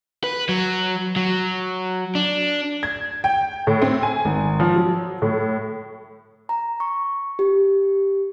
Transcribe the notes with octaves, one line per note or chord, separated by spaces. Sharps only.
B4
F#3
F#3
D4
G#6
G5
A2
C4
G#5
G#1
F3
F#3
A2
A#5
C#6
G4